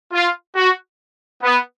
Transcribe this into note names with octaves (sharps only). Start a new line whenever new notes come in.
F4
F#4
B3